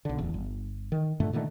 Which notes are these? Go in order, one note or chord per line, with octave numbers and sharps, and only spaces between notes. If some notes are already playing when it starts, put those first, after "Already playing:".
B1 D3
D1 E2
G1
D#3
G2 A#2 D3 A3
A#2 D3 D#3 A3